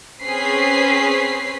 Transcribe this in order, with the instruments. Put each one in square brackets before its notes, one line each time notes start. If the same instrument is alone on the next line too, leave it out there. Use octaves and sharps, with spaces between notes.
[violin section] C4 C#4 G#4 B4 B6 C7